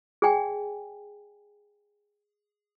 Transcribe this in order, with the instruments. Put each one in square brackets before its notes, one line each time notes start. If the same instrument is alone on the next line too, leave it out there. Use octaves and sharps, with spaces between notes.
[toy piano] G#4 D5 G5 G#5